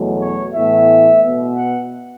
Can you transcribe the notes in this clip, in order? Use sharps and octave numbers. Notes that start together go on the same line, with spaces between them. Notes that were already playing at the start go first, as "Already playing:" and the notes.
Already playing: E2 B2 F#3 A3
C#5
A2 E3 B3 E5
B2 B3
F#5